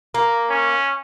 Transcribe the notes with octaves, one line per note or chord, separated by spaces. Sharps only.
A#3
C#4